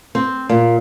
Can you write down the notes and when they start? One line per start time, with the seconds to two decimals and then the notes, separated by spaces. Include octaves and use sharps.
0.15 C4
0.49 A#2